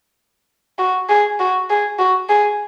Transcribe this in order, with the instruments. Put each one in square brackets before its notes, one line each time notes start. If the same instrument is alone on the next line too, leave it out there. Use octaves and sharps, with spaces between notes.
[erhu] F#4
G#4
F#4
G#4
F#4
G#4